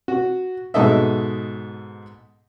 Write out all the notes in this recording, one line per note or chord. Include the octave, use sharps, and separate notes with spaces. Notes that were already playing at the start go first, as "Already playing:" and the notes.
F#4
G#2 B2 A4 D#5 E5